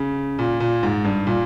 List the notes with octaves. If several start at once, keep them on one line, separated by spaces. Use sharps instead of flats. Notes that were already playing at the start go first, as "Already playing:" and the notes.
Already playing: C#3
A#2
A#2
G#2
G2
A#2